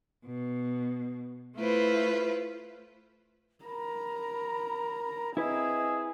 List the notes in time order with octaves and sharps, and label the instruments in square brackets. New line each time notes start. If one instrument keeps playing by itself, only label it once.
[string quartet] B2
A3 E4 F4 B4 C5
[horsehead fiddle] A#4 A#5 [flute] B5
[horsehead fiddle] C4 E5 [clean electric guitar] E4 B4 [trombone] G#4 [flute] D#5